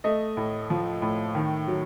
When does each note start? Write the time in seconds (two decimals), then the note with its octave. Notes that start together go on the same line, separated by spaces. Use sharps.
0.04 A3 D#5
0.37 A2
0.70 F3
1.02 A2
1.35 D#3
1.68 F#3